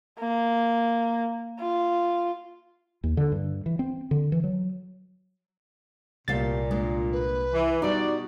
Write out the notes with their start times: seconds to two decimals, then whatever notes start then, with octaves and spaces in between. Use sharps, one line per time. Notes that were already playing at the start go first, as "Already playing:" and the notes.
0.20 A#3
1.60 F4
3.04 D#2
3.17 D3
3.32 G2
3.66 E3
3.79 C4
4.11 D3
4.32 E3
4.44 F#3
6.28 C2 A#2 A3 G4 F5 A6
6.71 G#3 A#3 D4
7.12 B4
7.52 E3
7.82 B2 G3 D#4 F#4 D5